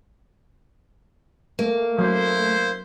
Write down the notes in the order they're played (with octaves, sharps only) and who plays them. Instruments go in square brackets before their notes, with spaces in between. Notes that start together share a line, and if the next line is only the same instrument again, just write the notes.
[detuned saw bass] A3 [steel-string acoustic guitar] A#3
[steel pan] F#3 [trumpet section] E4 C5